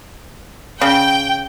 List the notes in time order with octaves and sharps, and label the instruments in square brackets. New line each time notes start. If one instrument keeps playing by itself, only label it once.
[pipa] C#3 [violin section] G5